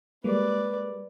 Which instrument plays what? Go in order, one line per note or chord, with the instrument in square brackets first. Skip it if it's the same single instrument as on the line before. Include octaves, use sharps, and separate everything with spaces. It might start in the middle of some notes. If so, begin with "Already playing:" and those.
[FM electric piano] G3 G#3 A#3 [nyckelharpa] B4 D5